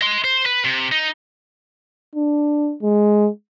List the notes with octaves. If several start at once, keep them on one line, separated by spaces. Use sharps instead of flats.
D#5 C6
C5
B4
C3
D#4
D4
G#3